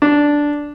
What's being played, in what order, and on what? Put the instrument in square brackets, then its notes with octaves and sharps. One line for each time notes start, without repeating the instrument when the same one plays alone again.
[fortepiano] D4